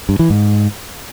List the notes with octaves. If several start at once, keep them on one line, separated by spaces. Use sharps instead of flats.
G2
E3
G#2